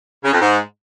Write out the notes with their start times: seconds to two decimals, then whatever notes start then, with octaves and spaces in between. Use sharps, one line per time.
0.24 C#3
0.33 F2
0.41 G#2